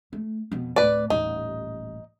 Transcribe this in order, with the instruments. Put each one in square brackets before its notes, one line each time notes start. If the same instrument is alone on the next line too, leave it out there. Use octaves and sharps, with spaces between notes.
[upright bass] A3
F2 B2
[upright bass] D1 A2 [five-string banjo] B4 D5
[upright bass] D#1 A1 [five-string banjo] D#4